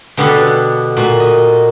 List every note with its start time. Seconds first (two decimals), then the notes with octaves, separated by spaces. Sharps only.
0.17 B2 D3 B3 G4 A4 B4
0.97 A#2 F#4
1.20 D#5